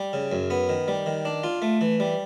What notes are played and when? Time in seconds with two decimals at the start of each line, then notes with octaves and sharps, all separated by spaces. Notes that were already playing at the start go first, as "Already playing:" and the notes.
Already playing: G3
0.13 C#3
0.32 F#2
0.50 B3
0.69 D#3
0.88 G3
1.06 D#3
1.25 D4
1.44 F4
1.62 A3
1.81 E3
2.00 G3